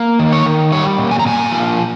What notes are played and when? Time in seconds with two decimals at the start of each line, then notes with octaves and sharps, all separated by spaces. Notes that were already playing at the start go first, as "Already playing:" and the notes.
Already playing: A#3
0.19 D#3
0.32 C#5
0.46 D#3
0.72 G3 C#5
0.98 A#2
1.11 G#5
1.19 A#5
1.26 A#2 G#5
1.51 F3